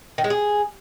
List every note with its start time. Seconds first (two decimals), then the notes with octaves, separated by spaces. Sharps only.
0.18 D#3
0.24 G#3
0.30 G#4